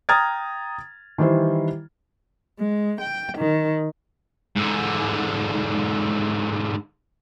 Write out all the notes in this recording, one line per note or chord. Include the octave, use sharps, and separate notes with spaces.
G5 A#5 D#6 F6 G#6 A6
D#3 E3 G3 E4 C5
G#3
G5
D#3
G#2 D3